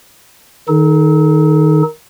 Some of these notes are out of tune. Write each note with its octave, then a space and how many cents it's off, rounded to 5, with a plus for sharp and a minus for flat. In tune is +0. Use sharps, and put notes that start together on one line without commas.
D#3 +0 D#4 +0 A4 -40